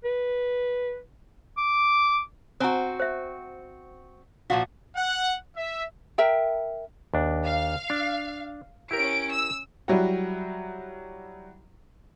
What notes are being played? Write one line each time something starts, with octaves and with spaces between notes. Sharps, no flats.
B4
D6
C4 F#4 C5 G#5 A#5
C5 E5
A#2 F3 F#4 F5
F#5
E5
A#4 E5 G5
D#2 D4
F5
D4
C#4 E4 G4 A#4 D7
E6
F#3 G3 E4 F#4